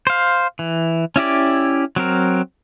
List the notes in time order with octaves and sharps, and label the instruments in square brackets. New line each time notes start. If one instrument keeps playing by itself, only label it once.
[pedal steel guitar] C5 F5
E3
C#4 E4 G4 D5
F#3 C4 A#4